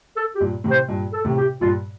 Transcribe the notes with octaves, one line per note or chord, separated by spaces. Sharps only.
A4
G4
G2 A#2
A2 C3
C5
G2 A#2
A4
A2 C3
G4
G2 A#2 F4